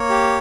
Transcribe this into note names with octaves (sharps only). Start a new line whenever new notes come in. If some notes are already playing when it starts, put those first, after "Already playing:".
Already playing: A#3 C#5
G4